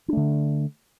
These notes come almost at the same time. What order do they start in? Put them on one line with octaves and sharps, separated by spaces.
D4 A3 D3